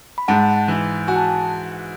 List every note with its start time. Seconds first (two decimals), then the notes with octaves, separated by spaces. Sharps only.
0.18 B5
0.28 G#2 F#5 A5
0.68 E3
1.08 F#4 G#5
1.16 A5